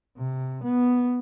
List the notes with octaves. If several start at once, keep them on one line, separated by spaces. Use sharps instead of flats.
C3
B3